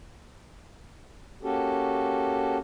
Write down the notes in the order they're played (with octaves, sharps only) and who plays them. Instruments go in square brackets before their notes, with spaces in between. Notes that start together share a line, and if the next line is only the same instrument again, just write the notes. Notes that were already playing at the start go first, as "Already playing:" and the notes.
[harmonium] A#3 C#4 F#4 G4 A4